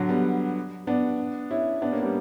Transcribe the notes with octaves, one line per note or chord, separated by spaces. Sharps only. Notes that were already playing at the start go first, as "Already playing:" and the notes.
Already playing: D3 F#3
G3 B3
B3 D4
C#4 E4
B3 D4
A#3 C#4
G3 B3